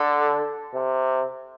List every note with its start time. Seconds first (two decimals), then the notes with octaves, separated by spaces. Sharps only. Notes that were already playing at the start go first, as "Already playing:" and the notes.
Already playing: D3 A4
0.74 C3